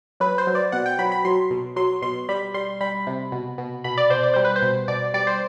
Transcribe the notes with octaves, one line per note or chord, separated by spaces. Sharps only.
F#3 B4
C5
F#3
D5
B2 F#5
G5
F#3 B5
B5
F#3 C6
B2
F#3 C6
B2 C6
G3 B5
G3 C6
G3 B5
C3
B2
B2
B2 B5
D5
B2 C5
D5
G3 C5
B4
C5
B2
B2 D5
G3 D5
C5